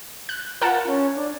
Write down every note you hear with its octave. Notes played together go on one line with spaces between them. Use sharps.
F#6
F4 A#4 F#5 A5
C#4
D4